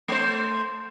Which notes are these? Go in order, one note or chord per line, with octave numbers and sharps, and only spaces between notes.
A3 C5